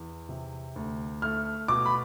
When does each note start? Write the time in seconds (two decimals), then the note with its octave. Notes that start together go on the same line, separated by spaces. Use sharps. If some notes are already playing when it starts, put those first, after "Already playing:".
Already playing: E2
0.29 C3
0.76 D2
1.22 A3 F6
1.68 B2 D6
1.86 B5